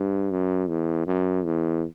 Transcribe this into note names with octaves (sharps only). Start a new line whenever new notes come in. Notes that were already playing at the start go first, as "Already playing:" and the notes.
Already playing: G2
F#2
E2
F#2
E2